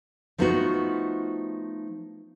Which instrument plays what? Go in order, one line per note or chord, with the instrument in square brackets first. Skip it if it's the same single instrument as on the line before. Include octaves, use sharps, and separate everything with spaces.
[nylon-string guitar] F3 A3 B3 D#4 F4 F#4